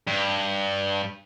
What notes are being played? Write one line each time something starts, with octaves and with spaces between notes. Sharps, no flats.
G2